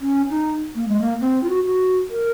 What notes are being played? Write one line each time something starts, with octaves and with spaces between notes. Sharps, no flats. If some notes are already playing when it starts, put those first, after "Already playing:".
C#4
D#4
A#3
G#3
A#3
C4
F4
F#4
F#4
A#4